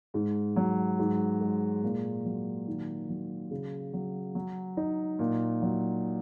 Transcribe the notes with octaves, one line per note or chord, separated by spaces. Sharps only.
G#2
F#3
G#2
G#3
A#2
F#3
D#3
F#3
C#3
F#3
F#3
D#4
A#2
F#3